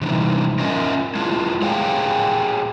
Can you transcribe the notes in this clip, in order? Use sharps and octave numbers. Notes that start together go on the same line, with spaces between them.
C3 E3 G3 D#4
C#4 F4 A#4 D#5 E5 G#5
G#3 E4 F4
G4 G#4 C#5 F5 G5 G#5